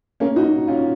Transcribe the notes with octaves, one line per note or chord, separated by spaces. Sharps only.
A#3 C#4
D#4 F#4
C#4 F4